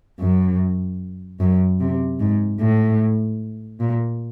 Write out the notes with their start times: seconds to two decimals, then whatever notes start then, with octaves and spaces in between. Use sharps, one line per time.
0.20 F#2
1.40 F#2
1.80 C3
2.20 G#2
2.60 A2
3.80 A#2